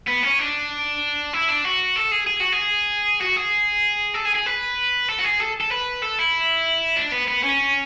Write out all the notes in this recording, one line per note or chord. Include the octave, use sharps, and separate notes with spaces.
B3
C#4
D4
E4
D4
F#4
A4
G#4
G#4
F#4
G#4
F#4
G#4
A4
G#4
G#4
B4
A4
F#4
G#4
A4
A4
B4
A4
E4
D4
B3
B3
C#4